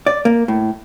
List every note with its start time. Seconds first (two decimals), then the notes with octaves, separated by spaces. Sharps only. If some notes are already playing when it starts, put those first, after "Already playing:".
0.07 D5
0.25 A#3
0.48 A2